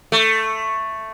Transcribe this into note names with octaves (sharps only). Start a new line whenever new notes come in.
A3